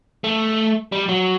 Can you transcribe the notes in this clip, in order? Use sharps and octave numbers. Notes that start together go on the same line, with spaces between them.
A3
G3
F#3